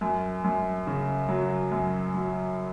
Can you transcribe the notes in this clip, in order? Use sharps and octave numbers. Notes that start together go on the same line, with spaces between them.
F#2
F#2
C#3
F#3
F#2
F#3